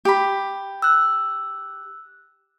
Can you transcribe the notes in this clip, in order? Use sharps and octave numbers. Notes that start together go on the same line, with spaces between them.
G4 B5
E6 F#6